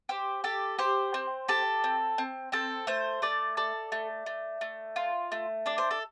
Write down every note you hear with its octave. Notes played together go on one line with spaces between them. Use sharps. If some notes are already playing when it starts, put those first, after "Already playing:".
G4 C5
G4 A4
G4 C5
C4
G4 A4
C4
C4
C4 A4
A3 C5
A3 D5
A4 D5
A3
A3
A3
F4
A3
D4 D5
C5
A4